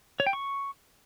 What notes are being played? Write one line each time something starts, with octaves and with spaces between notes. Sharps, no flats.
C#5
G5
C#6